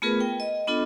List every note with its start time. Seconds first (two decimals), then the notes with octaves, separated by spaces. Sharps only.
0.02 A3 B3 F4 G#4 A#4 B4
0.20 G5
0.40 D#5
0.67 B3 D4 F4 A4 D#5